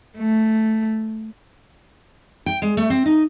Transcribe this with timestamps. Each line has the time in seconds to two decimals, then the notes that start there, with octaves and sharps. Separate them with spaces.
0.18 A3
2.46 G5
2.62 G#3
2.77 A3
2.90 C4
3.06 D#4